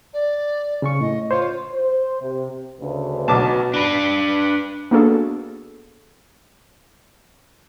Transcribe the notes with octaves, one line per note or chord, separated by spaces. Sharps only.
D5
C#3 C#4 C#6
A2 D#5
F4 C5 C#5
C5
C3
D2 C#3 B4
B1 B2 F#3 A5 D6
D4 B4
A#3 B3 D4 F#4 G#4 A4